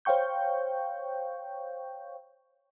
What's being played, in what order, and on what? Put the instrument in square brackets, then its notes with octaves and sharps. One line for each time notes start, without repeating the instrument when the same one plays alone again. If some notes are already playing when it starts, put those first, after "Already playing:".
[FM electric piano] C5 C#5 F5 G5 C#6 G6